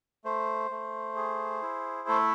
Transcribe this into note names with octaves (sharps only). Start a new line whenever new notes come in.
A3 C5
A3
G#4
E4
A3 A4